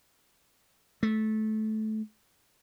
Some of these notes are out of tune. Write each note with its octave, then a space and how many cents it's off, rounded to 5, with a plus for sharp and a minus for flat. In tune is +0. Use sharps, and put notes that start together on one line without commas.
A3 -20